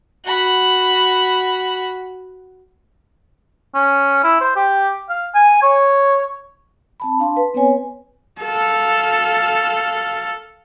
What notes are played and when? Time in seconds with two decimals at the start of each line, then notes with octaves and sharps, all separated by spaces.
0.25 F#4 B5
3.75 C#4
4.24 E4
4.41 C5
4.56 G4
5.09 F5
5.35 G#5
5.63 C#5
7.00 C4 A5 B5
7.20 D4 F5 A5 C6
7.37 B4
7.54 B3 C4 B4 C#5 G#5
8.41 A4 F5